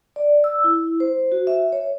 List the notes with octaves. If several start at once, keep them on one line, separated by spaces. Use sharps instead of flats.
D5
E6
E4
C5
F#4
E5
C#5